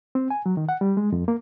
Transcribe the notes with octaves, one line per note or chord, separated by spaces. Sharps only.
C4
G#5
F#3
D#3
F#5
G3
G#3
F2
A#3